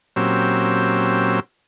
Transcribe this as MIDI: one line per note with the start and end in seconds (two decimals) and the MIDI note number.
0.16 1.40 46
0.16 1.40 54
0.16 1.40 60
0.16 1.40 61
0.16 1.40 67
0.16 1.40 88